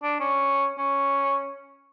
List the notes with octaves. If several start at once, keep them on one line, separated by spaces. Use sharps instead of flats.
D4
C#4
C#4